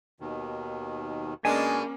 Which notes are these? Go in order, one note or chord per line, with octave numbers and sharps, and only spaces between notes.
D#2 B2 D#3
B2 G#3 A#3 C#4 D4 G#5